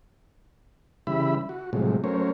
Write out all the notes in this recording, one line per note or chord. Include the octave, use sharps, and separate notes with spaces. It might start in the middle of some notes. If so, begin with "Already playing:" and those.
C#3 E3 G3 E5 B5
F#4
A2 C3 F3 F#3 G#3
F#3 A3 C#4 A#4 C5 C#5